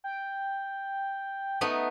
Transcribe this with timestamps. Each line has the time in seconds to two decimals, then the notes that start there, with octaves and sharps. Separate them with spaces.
0.04 G5
1.61 A3 B3 D#4